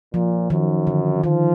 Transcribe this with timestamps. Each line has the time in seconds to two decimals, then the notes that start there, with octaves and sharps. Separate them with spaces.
0.14 A#2 F3
0.50 F#2 D#3
0.87 D3
1.24 D#3 F3